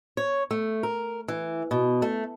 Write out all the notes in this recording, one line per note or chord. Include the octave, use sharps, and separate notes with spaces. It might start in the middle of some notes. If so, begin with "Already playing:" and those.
C#5
A3
A#4
E3
B2
A3